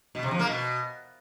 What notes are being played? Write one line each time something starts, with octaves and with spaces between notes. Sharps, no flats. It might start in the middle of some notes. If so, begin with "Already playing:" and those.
B2
C3
F3
A#3
B2